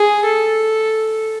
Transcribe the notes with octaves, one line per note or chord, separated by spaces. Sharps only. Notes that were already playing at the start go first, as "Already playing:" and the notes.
Already playing: G#4
A4